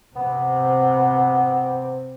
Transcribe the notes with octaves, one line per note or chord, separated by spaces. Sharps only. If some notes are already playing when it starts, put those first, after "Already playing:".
C3 B3 C4